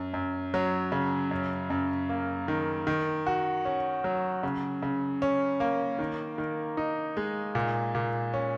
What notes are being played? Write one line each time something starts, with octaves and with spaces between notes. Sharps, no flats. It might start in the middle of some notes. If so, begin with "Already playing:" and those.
Already playing: F#2
F#2
F#3
C#3
F#2
F#2
A#3
D#3
D#3
F#4
C#4
F#3
C#3
C#3
C#4
A#3
D#3
D#3
D#4
G#3
A#2
A#2
C#4